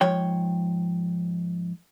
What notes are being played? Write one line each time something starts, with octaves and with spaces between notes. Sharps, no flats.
G#2 F3 C#5 G5